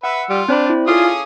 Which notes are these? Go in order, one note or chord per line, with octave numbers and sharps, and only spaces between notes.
B4 E5 F#5 E6
G3 F4
C4 D4 C5 B5
E4 D5
C#4 F4 G#4 A4 F5 D6 D#6